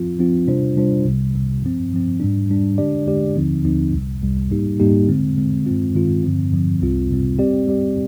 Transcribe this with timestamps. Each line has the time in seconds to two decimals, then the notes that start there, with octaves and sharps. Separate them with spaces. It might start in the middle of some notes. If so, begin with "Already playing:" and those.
Already playing: F3 C4 F4
0.19 F3 C4 F4
0.47 C3 G3 D4 F4 C5
0.76 C3 G3 D4 F4 C5
1.05 C2 C3 G3
1.34 C2 C3 G3
1.63 G2 F3 C4
1.91 G2 F3 C4
2.20 G#2 G3 D4
2.49 G#2 G3 D4
2.78 D3 G#3 D4 G4 D5
3.06 D3 G#3 D4 G4 D5
3.36 D#2 D3 F3 C4 D#4
3.64 D#2 D3 F3 C4 D#4
3.93 C2 C3 G3
4.22 C2 C3 G3
4.51 G#2 G3 A#3 D#4 G4
4.80 G#2 G3 A#3 D#4 G4
5.08 D3 G#3 C4
5.37 D3 G#3 C4
5.66 G2 D#3 G#3 C4 F4
5.95 G2 D#3 G#3 C4 F4
6.23 G2 D3 F3 C4
6.52 G2 D3 F3 C4
6.81 C2 C3 G3 C4 F4
7.09 C2 C3 G3 C4 F4
7.39 G3 C4 G4 D5
7.67 G3 C4 G4 D5